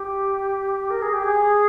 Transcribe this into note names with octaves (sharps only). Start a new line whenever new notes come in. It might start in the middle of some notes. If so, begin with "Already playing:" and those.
Already playing: G4
A#4
G#4
G4
G#4